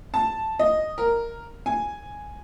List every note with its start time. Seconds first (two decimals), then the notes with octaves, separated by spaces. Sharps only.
0.14 A5
0.59 D#5
0.98 A#4
1.66 G#5